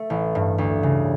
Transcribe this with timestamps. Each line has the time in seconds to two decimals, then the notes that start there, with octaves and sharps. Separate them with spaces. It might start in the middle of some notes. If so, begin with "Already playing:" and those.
Already playing: A3
0.10 A1
0.35 G2
0.58 D2
0.83 C#3